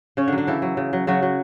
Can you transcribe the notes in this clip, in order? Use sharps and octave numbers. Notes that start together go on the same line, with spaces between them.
C#3 C#4 C#5
D3 D4
F#3
D3 D4
C#3 E3 E4
F#3
C#3
F#3
C#3 F#3 F#4
F#3